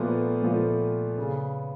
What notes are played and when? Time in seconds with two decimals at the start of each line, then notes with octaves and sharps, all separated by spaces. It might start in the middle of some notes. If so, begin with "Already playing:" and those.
Already playing: A#2 F3 A3 B3
0.42 A#2 F3 A3
1.18 C#3